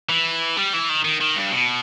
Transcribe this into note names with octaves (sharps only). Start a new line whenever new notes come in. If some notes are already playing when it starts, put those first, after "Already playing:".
E3
G3
E3
D#3
D#3
D#3
G2
B2